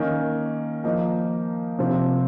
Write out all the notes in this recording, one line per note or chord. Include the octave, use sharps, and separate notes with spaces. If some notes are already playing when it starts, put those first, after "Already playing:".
Already playing: D#3 A#3 C#4
F3 A#3 D#4
C3 F3 C4